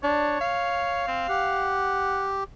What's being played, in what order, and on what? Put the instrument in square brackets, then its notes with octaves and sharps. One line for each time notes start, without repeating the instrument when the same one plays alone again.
[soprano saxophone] D4 [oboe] C#5
[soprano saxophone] F5
[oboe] C4
[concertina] G4 [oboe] F#5